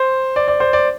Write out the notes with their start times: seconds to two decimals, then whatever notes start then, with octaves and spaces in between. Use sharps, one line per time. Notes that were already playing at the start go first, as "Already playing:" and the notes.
Already playing: C5
0.36 D5
0.48 D5
0.60 C5
0.73 D5